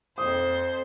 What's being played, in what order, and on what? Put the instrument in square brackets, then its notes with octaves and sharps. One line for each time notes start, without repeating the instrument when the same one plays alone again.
[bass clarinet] F2 [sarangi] C5 [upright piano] D#6